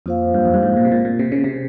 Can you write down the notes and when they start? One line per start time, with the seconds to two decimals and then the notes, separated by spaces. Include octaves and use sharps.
0.06 F2 A#3 F4 C5 F5
0.34 G2
0.45 F2
0.54 G2
0.63 G#2
0.77 A#2
0.85 C3
0.92 A#2
1.05 A#2
1.19 C3
1.32 C#3
1.44 C3